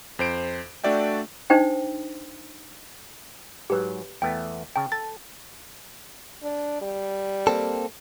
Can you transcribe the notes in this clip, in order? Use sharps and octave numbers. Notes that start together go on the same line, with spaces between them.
F2 C5 D7
A3 D4 F#4 D5 E5 G5
D4 D#4 C5 G5
G#2 F#3 G4 B4
E2 A3 B3 G5
C#3 G5 A5
A4 A6
D4
G3
A#3 C4 A4